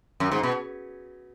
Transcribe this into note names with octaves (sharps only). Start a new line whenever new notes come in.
F#2
G#2
B2